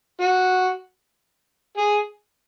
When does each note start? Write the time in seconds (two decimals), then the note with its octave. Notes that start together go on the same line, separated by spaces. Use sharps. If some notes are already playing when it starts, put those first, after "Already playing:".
0.21 F#4
1.77 G#4